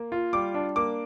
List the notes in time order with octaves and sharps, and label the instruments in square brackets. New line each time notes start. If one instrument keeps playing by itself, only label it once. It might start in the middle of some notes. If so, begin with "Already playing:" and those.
Already playing: [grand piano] A#3
F4
G3 D6
D4
A#3 D6